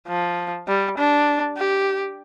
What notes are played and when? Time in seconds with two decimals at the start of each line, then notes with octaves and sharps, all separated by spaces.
0.08 F3
0.68 G3
0.98 D4
1.58 G4